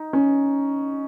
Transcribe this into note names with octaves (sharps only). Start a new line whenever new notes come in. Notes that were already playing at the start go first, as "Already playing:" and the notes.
Already playing: D#4
C#4